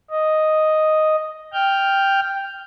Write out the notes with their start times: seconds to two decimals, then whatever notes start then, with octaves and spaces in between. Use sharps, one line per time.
0.11 D#5
1.53 G5 F6 G6